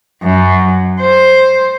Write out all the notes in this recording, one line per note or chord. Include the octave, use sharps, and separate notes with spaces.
F#2
C5